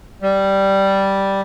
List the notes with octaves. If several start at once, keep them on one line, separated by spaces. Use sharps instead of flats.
G3